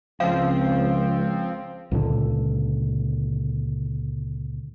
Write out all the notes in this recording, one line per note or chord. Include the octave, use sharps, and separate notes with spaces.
C#2 F3 C4 F5
C#2 A#2 D3